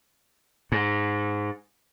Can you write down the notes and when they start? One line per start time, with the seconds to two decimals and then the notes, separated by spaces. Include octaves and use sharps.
0.72 G#2